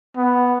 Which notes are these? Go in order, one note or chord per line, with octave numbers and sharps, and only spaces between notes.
B3